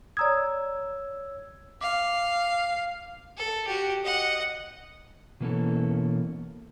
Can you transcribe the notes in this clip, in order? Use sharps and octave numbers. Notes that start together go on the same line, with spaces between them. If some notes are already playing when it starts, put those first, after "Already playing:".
C#5 D5 A#5 D#6 E6 G#6
F5 D6
A4
F#4 G4
D#5 F#5
B2 E3 A#3 B3 C#4 A4